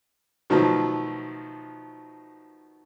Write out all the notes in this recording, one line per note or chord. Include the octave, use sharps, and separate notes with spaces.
B2 D#3 F3 F#3 A3